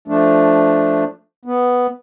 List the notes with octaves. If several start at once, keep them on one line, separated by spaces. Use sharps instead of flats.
F3 A3 D4
B3